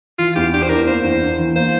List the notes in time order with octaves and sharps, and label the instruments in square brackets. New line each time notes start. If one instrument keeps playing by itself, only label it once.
[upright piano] E3 [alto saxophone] F4
[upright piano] E2 [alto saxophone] G4
[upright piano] D4 [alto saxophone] G4
[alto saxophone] C5
[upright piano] D4 [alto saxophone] A#4
[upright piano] A#3 [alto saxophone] C5
[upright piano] E2
D4
E3
[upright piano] A#3 [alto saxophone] C5